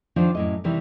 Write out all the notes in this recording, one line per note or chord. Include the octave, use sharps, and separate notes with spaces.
D#3 F3 D4 F4 C5 D5
F#2 A2 D#5
C3 D#3 E3 G3